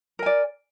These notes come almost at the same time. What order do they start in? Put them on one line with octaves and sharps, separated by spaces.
A#4 G#5 D5